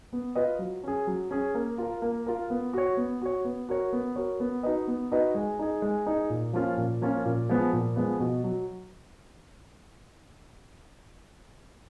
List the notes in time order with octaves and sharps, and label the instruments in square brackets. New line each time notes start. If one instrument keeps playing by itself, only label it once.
[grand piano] B3
F4 B4 D#5
F#3
C#4 G#4
F#3
C#4 G#4
A#3
F4 A#4
A#3
F4 A#4
B3
F#4 C#5
B3
F#4 C#5
B3
F#4 A#4 C#5
B3
F#4 A#4 C#5
B3
D#4 F#4 B4 D#5
B3
D#4 F#4 B4 D#5
G#3
D#4 G#4
G#3
D#4 G#4
A#2
F3 A#3 C#4 F4
A#2
F3 A#3 C#4 F4
A#2
F3 G#3 B3
A#2
F3 G#3 B3
B2
F#3